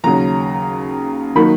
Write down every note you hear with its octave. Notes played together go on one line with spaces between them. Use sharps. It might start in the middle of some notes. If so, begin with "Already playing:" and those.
D#2 C#3 F#3 C#4 A#5
D#3 F#3 A#3 D#4 B5